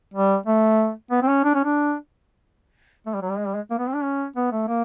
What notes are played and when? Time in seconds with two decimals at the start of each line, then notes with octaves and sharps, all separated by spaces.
0.14 G3
0.46 A3
1.11 B3
1.22 C4
1.28 C#4
1.44 D4
1.55 C#4
1.65 D4
3.06 A3
3.14 G3
3.22 F#3
3.30 G3
3.38 G#3
3.47 G3
3.55 G#3
3.71 A#3
3.79 B3
3.88 C4
3.95 D4
4.03 C#4
4.36 B3
4.52 A3
4.68 A#3